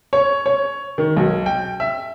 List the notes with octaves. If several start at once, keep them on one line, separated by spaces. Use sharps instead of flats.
C#5
C#5
D#3
B1
G5
E5